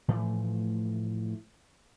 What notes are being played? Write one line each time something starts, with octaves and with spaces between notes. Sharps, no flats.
A2 E3 F3 A3